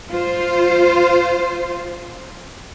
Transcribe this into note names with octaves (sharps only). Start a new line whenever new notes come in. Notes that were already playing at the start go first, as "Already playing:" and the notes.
F4 C5